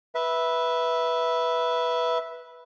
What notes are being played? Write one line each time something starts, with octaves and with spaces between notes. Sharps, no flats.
B4 E5